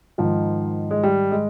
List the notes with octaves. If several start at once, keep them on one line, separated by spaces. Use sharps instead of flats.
G#2 D#3 F3
G#3
G3
G#3